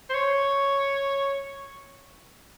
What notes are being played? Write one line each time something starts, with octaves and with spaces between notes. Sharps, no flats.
C5
C#5